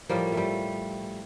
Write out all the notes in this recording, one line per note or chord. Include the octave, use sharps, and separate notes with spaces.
A2 F3 G3 A#3
A3
G3